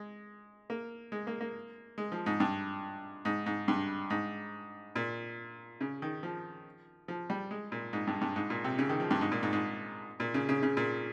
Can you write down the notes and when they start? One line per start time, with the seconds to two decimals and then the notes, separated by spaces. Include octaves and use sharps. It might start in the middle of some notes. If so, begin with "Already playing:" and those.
Already playing: G#3
0.70 A#3
1.12 G#3
1.27 A#3
1.41 A#3
1.98 G#3
2.12 F3
2.26 G#2
2.40 G2
3.25 G#2
3.46 G#2
3.68 G2
4.10 G#2
4.96 A#2
5.81 C#3
6.02 D#3
6.23 F3
7.08 F3
7.30 G3
7.51 G#3
7.72 A#2
7.93 G#2
8.07 G2
8.21 G2
8.36 G#2
8.50 A#2
8.64 C3
8.79 C#3
8.89 D#3
9.00 F3
9.11 G2
9.21 G#2
9.32 A#2
9.43 G#2
9.53 G#2
10.20 A#2
10.34 C#3
10.49 C#3
10.63 C#3
10.77 A#2